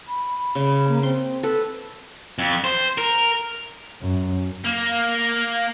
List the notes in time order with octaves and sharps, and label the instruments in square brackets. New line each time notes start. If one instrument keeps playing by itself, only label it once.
[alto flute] B5
[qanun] C#3
[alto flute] A#3
[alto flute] C4 [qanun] C6
[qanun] A4 B4
[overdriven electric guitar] F2
C5
A#4
[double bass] F#2
[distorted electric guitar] A#3